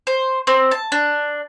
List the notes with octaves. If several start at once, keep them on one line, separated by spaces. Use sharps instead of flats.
C5
C4
A5
D4